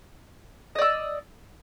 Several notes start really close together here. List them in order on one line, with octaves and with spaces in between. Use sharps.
D#5 D5 E6